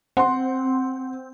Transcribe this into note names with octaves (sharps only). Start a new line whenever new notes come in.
C4 F#5 C6